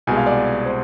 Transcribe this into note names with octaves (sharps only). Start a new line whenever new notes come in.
C2 B2 G#3 G#5
F5
D5
C5